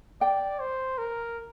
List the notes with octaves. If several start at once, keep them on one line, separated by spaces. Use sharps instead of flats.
D5 G5
C5
A#4